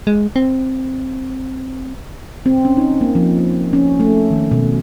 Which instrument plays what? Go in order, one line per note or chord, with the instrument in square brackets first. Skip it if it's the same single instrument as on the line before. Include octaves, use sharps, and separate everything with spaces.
[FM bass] G#3
C4
[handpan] C4
C#4
D#4
A#3
F3
C#4
A3
D#3
B2